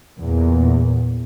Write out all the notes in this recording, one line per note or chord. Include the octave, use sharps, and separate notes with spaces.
E2 A#2